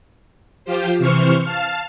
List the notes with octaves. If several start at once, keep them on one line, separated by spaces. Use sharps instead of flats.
F3 F4 G4 C5
C3 E3 C5 C#6 F6
F5 A5 F6